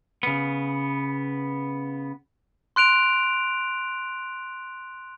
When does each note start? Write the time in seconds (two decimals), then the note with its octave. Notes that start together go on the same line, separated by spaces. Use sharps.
0.23 C#3 B3
2.76 C6 F#6 D7 F7